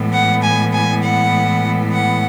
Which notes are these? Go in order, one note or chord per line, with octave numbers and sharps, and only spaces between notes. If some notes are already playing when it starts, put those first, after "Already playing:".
Already playing: A2 E3 G#3 B3
F#5
G#5
G#5
F#5
F#5